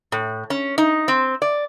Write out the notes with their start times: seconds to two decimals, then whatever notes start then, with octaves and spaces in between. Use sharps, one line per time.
0.12 A2
0.50 C#4
0.78 D#4
1.08 C4
1.42 D5